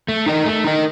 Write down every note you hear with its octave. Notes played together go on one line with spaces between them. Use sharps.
A3
D#4 A#4 D#5
A3
D#4 A#4 D#5